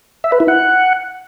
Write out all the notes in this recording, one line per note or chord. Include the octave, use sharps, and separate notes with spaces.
E5
B4
E4
F#5